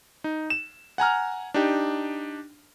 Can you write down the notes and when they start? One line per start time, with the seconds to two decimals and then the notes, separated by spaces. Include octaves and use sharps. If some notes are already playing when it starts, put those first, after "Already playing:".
0.24 D#4
0.50 E7
0.98 F#5 G#5 A#5 F6
1.54 D4 D#4 G4